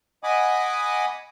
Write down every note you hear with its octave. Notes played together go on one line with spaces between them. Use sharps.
D#5 F#5 G#5 B5 D6 D#6